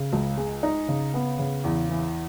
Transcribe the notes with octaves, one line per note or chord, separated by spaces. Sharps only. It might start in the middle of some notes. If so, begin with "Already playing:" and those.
Already playing: C#3
C#2
G#3
D#4
C#3
B3
C#3
E2
E3